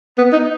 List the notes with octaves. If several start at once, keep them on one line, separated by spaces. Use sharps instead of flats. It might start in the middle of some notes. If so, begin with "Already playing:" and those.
B3
D#4